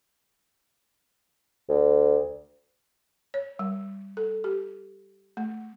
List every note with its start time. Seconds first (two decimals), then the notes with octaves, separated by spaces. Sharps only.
1.69 D2
3.34 C#5
3.59 G3
4.17 A4
4.44 G4
5.37 A3